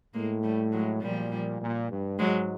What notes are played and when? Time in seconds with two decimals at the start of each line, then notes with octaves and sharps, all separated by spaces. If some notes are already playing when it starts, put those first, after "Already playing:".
0.14 A2 G#3 A#3
0.43 G3 A3
0.72 F#3 G#3
1.01 A#2 F3 G3
1.60 A#2
1.90 G2
2.19 G#2 F#3 G#3